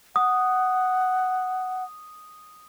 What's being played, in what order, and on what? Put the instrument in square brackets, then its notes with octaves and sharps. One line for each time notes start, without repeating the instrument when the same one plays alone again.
[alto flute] F#5 [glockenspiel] D#6